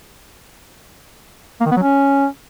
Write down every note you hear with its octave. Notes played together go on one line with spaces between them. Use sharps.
A#3
D#3
B3
F#3
C#4